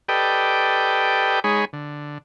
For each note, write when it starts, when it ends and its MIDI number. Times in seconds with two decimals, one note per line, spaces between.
0.09 1.40 67
0.09 1.40 69
0.09 1.40 71
0.09 1.40 74
0.09 1.40 75
0.09 1.40 79
1.44 1.65 56
1.44 1.65 63
1.44 1.65 68
1.44 1.65 73
1.44 1.65 83
1.73 2.18 50